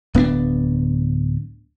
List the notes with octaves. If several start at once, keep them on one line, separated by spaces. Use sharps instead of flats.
D1 B3 C4 D4